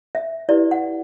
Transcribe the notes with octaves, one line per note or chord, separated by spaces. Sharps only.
E5
E4 G4 B4 D5
F#5